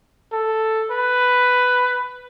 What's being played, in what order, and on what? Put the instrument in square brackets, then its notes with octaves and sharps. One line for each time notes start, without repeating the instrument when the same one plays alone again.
[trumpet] A4
B4